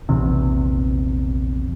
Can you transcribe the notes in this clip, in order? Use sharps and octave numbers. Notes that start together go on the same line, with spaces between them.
A#1 E2 C3